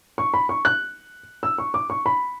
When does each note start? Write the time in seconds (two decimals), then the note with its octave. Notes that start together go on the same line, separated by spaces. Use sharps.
0.18 C#6
0.34 B5
0.49 C#6
0.65 F#6
1.43 E6
1.58 C#6
1.74 D6
1.90 C#6
2.06 B5